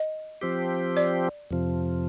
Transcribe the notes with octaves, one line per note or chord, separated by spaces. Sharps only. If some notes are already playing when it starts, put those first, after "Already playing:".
Already playing: D#5
F3 C4 G4
D5
F2 C3 F3